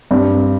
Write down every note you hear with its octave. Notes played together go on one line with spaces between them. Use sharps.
G2 G3 C4